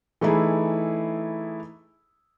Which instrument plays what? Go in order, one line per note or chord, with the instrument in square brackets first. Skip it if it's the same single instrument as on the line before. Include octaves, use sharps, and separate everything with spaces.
[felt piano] E3 A3 D#4 E4 G#4